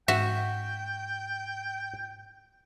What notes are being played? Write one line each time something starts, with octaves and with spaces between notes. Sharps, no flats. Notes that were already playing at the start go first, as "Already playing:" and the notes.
G#2 F#4 E5 G5